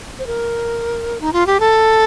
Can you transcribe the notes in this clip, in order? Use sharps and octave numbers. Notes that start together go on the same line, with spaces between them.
C5
A#4
D#4
F4
G4
A4